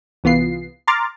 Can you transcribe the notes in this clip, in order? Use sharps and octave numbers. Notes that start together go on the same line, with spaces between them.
C2 E3 B3 F4 C7
A#5 C6 D6 F6 A6